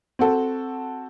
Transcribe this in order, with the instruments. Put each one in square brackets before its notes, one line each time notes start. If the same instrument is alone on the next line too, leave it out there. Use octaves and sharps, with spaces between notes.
[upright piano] C4 F#4 A4